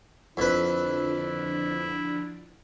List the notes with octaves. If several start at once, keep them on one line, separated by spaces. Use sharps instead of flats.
F2 D3 F3 D4 E4 B4